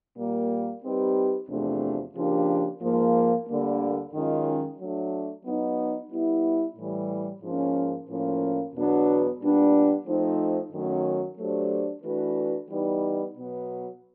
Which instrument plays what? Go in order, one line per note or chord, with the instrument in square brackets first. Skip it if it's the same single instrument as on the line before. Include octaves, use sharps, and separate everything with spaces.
[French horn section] A#2 G3 A#3
G3 C4 D#4 G4 B4
E2 C3 F3 A3 D4
C#3 F3 A#3 D4 G4
G#2 F3 A#3
D2 D3 G3 A#3
F#2 D#3 G#3 C#4 F4
F#3 A3 D4
F#3 B3 D#4
G3 B3 E4
A2 E3 G3
G#2 F3 A#3 C#4
A2 F3 A#3 C#4
E2 B2 F#3 B3 D4
A#2 G3 B3 D4
F3 A3 C4 D#4
F#2 D#3 F#3 A3 C#4
F#3 A3 D4 G4 C5
E3 A3 D4 F#4 B4
E3 G3 B3 D#4
B2 F#3 B3